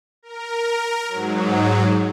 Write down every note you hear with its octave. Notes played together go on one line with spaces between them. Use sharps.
A#4
G#2 F#3